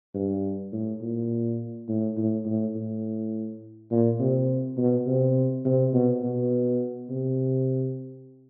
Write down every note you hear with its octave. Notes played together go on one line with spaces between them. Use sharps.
G2
A2
A#2
A2
A2
A2
A2
A#2
C3
B2
C3
C3
B2
B2
C3